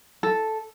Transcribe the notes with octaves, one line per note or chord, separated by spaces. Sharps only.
A4